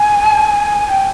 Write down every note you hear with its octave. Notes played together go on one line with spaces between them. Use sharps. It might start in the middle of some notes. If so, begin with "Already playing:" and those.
Already playing: G#5
G5